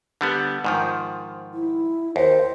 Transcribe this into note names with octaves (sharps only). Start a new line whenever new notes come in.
D3 G3 B3
G#2 D#3 F3
E4
D#2 C5